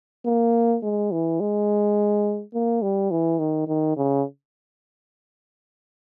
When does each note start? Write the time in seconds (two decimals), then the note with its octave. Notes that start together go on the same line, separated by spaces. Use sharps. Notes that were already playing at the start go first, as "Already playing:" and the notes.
0.26 A#3
0.83 G#3
1.12 E3
1.40 G#3
2.54 A#3
2.82 G3
3.11 E3
3.39 D#3
3.68 D#3
3.97 C#3